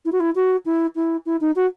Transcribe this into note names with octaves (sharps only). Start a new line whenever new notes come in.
E4
F#4
E4
F#4
E4
E4
E4
D#4
F#4